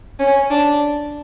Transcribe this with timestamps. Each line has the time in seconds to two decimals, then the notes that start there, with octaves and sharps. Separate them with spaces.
0.19 C#4
0.50 D4